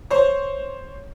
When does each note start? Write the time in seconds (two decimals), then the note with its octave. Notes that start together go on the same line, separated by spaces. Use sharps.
0.10 C5 C#5